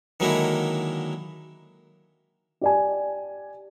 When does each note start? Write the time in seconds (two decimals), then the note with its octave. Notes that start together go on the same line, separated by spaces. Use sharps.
0.20 D3 D#3 F#3 G#3 A#3 E4
2.61 G4 D5 G#5